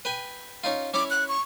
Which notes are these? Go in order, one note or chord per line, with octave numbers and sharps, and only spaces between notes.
B4 G5 G#5
C#4 D#4 F4
C#4 E4 C#5 D6
F#6
C#6